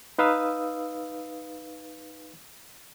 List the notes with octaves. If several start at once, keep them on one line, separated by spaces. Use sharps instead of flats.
D#4 B4 F5 D#6 E6